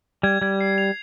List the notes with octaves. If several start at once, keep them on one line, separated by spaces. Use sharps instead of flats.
G3 G#6
G3 G#6
C7
F7